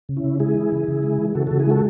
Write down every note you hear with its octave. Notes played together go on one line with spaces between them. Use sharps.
C#3
C#4 E4
C#3
G#3 E4 G#4
E3
C#3
C#3
G#3
E3
C#3 F#4 A4
C#3 F#4 A4
E4 G#4
G#3 F#4 A4